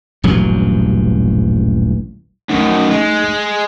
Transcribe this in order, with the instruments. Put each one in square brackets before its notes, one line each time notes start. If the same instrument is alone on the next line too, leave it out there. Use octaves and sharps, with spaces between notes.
[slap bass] D#1 A1 G2 F#3
[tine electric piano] A#1 A3 D#4 [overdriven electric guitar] F#2 D#3
[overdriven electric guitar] G#3